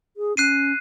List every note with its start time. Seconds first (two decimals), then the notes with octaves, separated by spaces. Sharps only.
0.17 G#4
0.37 C#4 F#6 C7 D#7